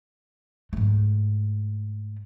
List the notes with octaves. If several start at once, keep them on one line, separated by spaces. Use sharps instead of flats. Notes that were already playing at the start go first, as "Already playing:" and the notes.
G#2 A3